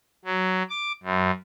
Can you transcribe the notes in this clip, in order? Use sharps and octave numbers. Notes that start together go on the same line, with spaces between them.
F#3
D6
F#2